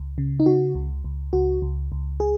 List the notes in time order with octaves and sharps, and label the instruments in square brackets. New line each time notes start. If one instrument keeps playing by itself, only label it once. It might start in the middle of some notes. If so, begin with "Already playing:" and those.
Already playing: [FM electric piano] C#2
C#3
D#4
C#3 F#4
C#2
C#2
C#2 F#4
C#2
C#2
G#4